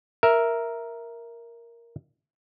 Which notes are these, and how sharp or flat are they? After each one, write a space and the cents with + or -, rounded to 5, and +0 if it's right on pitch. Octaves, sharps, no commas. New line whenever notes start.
A#4 +0 E5 +0